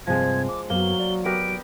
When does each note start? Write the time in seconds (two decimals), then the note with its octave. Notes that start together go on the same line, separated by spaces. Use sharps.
0.07 G2 C3 F3 G#3 C4 G#6
0.48 D6
0.70 F#2 F#3 A#3 B3 G7
1.00 D5
1.25 B3 G4 A#4 D7